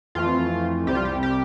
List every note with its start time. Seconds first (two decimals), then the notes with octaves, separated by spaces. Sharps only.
0.15 F2 E3 A3 F4
0.86 C2 C3 G3 G4
0.95 F4
1.05 G4
1.23 G4